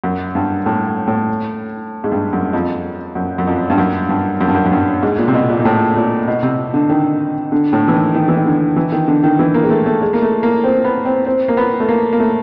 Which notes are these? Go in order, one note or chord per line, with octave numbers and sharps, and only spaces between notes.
F#2
G2
A2
A2
G#2
G2
F#2
F2
F#2
F#2
F2
G2
F#2
G2
F#2
G2
F#2
F#2
G2
G#2
A#2
C3
B2
A#2
A#2
A2
A#2
B2
C3
D3
D#3
D3
A2
E3
D#3
D#3
E3
D#3
D3
E3
D#3
D3
D#3
E3
A#3
G#3
A3
A3
G#3
A#3
A3
A#3
C4
B3
C4
C4
A#3
B3
A3
A#3
A#3
A3